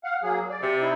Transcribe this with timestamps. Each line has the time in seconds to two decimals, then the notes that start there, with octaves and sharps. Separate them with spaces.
0.04 F5 F#5
0.23 F#3 A#3 G#4
0.50 D5
0.62 C3
0.81 D#4 E4